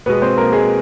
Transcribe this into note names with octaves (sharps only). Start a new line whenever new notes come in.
B2 G#3 B3 B4
C4 C5
A#3 A#4
G#3 G#4